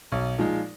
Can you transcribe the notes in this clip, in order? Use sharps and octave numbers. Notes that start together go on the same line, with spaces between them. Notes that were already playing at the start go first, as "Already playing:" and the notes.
B1
A#2 F3 G#3 D#4